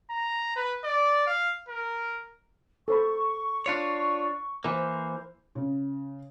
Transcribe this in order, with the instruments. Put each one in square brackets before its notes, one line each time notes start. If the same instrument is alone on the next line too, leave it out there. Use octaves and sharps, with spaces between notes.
[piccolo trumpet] A#5
B4
D5
F5
A#4
[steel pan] A4 C5 B5 [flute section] C#6
[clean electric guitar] D4 F4 C#5
[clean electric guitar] E3 A#3 [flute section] C5
[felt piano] C#3